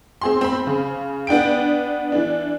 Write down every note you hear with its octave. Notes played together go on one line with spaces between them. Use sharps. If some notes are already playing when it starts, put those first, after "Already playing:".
C4 G#4 C6
C4 B5
C#3
B3 D4 G5 D7
E3 D4